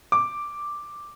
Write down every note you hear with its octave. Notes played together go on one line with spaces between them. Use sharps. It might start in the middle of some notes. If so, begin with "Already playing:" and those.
D6